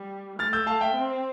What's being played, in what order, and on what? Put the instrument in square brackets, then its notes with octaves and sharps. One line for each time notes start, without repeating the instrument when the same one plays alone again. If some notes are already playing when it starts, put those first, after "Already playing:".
Already playing: [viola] G3
[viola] A3 [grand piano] F6 A6
[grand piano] E6 G6
F5 A5
E5 G5
[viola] C4